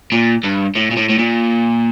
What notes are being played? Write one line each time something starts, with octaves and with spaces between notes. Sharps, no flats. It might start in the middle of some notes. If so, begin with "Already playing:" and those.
A#2
G2
A2
A#2
A2
A2
A#2